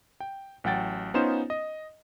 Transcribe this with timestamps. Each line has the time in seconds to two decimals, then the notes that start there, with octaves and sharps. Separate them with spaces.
0.20 G5
0.64 A1 F#3 F#5 G5 A6
1.14 B3 C#4 D#4 F4 C5 E7
1.50 D#5